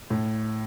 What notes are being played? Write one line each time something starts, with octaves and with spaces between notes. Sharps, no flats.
A2